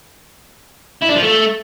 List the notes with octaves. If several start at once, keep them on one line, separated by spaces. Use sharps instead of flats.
E4
D4
F3
A3